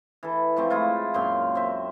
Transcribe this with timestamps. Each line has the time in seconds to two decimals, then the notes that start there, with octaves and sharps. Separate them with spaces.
0.23 E3 A4
0.57 F3 A3 C4
0.70 G#3 E4 F4
1.14 F#2 A#2 F5 G5
1.55 C4 E5